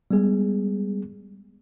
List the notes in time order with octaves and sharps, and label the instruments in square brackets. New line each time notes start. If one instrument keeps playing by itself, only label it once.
[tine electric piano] G3 G#3 B3 G#4